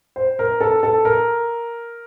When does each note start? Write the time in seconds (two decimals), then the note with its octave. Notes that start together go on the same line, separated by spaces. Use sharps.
0.16 C5
0.39 A#4
0.60 A4
0.83 A4
1.05 A#4